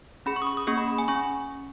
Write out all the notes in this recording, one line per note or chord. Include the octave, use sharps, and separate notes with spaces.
C#4 G#4 B5
C#6
D#6
C#6
D#6
A#3 C#4 G#4 C#6
B5
B5
G#5
C#4 C#6